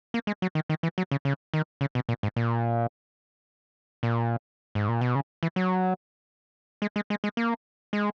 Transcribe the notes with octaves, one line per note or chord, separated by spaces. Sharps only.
A#3
G#3
F#3
D#3
D#3
E3
F#3
C#3
C#3
D#3
C#3
B2
A#2
G#2
A#2
A#2
G#2
A#2
B2
C#3
E3
F#3
G#3
G#3
G#3
G#3
A#3
G#3